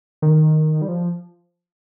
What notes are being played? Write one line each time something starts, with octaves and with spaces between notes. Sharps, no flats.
D#3
G3
F3